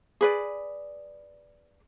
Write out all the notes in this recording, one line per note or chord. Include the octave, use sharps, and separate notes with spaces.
G#4 B4 D5